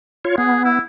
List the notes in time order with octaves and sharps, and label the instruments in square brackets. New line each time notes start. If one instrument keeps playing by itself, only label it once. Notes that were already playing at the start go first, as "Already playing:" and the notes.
[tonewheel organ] F4 C#5
[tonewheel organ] B3 [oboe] G#4
[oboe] E4